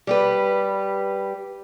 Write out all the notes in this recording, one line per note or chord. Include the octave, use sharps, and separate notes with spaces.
G3 G4 B4